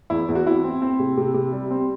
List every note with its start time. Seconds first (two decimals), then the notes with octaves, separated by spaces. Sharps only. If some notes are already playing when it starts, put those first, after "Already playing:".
0.10 E2 E4
0.29 E2
0.35 F#4
0.46 C4 E4
0.64 C4
0.82 C4
0.99 C3
1.17 C3
1.34 C3
1.52 G3
1.71 C4